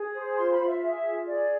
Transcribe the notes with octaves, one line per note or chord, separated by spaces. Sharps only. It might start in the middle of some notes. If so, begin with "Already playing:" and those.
Already playing: G#4
C5
F4 C6
B5
F4
E5
G#4 E5
F4
G#4 D5